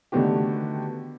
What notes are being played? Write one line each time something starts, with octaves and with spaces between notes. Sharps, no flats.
D3 D#3 A3 B3 F#4 G4